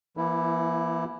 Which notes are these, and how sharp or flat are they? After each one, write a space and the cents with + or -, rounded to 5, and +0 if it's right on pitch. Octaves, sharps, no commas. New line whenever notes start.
E3 +35 A#3 +45 E4 +0